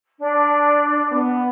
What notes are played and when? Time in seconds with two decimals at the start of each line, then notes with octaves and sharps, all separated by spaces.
0.18 D4
1.12 B3